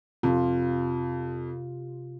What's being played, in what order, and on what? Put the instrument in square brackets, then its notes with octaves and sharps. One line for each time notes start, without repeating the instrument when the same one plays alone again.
[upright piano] F2 [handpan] C3 F4